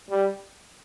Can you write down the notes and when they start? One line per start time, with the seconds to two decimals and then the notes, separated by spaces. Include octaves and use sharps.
0.10 G3